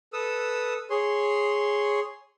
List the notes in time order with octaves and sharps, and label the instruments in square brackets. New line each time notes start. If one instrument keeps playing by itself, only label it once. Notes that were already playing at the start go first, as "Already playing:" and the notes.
[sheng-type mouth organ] A4 B4 D#6 E6
G#4 C#5 C6